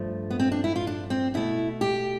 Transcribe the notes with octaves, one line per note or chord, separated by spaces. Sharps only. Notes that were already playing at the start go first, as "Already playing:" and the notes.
Already playing: G2 F3 A3
B3
C4
D4
E4
F4
D4
C4
B2 A3 E4
G4